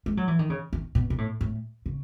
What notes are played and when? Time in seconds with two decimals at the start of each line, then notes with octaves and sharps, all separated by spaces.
0.06 G#3
0.17 F#3
0.28 E3
0.39 D#3
0.50 C#3
0.73 D#3
0.95 B2
1.10 B2
1.18 A2
1.41 A2
1.86 C#3